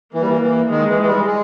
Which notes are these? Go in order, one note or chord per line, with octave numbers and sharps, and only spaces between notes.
E3 A#3
G3
E3
E3
D#3 G#3
E3
E3
G3
G#3